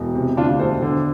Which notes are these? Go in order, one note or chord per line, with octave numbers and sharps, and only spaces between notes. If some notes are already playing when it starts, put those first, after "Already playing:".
Already playing: E1
C3
D2 D4 F4
E1 A4 C5
D3